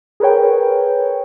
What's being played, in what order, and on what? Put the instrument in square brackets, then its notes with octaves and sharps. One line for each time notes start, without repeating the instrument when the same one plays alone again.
[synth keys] G#4 A#4 B4 C#5 G5